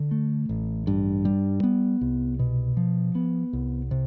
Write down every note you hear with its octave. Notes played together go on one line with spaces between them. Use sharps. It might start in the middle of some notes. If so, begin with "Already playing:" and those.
Already playing: D3
A3
A1
G2
G3
B3
C2
B2
F3
B3
C2
C3